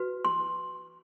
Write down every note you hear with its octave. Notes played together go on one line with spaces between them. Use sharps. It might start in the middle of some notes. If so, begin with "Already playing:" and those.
Already playing: F#4 B4
C6